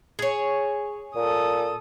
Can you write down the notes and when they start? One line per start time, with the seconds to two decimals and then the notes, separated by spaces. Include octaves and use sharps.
0.19 G#4 C#5
1.16 A#2 A4 D#6